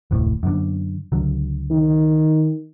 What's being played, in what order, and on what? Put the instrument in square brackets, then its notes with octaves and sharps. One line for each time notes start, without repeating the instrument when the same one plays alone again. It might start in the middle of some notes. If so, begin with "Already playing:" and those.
[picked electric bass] F1 D2 A2
F#2 D3
C#2 D3 F#3
[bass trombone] D#3